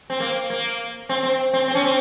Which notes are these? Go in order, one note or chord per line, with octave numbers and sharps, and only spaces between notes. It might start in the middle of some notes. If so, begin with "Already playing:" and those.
C4
A#3
A#3
C4
C4
C4
C4
C#4
C4